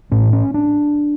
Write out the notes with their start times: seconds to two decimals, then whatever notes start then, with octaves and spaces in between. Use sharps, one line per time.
0.12 A2 C#4
0.33 C#4
0.54 D4